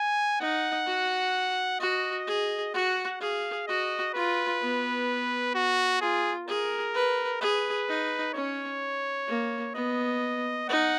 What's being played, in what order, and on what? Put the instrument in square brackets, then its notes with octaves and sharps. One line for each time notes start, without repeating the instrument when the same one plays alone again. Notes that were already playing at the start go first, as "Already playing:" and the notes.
Already playing: [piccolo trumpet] G#5
[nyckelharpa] D#4 [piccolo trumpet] F#5
[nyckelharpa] F#4
[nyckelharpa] F#4 [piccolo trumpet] D#5
[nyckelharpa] G#4
[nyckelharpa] F#4 [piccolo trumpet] F#5
[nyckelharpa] G#4 [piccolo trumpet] F5
[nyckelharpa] F#4 [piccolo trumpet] D#5
[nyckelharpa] F4 [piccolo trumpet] B4
[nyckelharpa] B3
[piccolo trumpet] F#4
[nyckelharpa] F4 [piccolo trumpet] G#4
[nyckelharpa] G#4 [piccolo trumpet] A#4
[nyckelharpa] B4
[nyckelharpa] G#4 [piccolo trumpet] B4
[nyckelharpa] D#4
[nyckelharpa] C#4 [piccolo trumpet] C#5
[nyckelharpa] A#3
[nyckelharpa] B3 [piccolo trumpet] D#5
[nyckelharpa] D#4 [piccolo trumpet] F#5